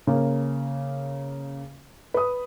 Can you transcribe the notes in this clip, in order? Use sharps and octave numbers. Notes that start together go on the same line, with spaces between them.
C#3 A#3
B4 D#6